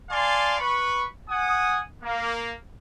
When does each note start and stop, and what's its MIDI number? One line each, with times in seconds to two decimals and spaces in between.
0.10 0.55 74
0.10 0.55 77
0.10 0.55 80
0.10 0.55 81
0.10 0.55 84
0.10 0.55 86
0.58 1.04 71
0.58 1.04 83
0.58 1.04 85
1.29 1.80 78
1.29 1.80 80
1.29 1.80 87
2.03 2.51 58